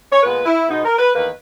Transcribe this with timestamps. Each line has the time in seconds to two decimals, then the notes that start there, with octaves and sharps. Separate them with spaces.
0.11 C#5
0.23 A#2 G#3 B3 B4
0.46 E4
0.69 B2 G#3 B3 D#4
0.84 A#4
0.98 B4
1.14 E2 D#3 A#3 B4